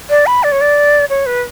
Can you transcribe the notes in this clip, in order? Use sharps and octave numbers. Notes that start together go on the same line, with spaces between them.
D5
B5
D5
C#5
D5
C#5
B4